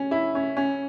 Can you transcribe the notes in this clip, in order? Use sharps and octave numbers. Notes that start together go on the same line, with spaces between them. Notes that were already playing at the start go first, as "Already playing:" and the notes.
Already playing: C#4
E4
C#4
C#4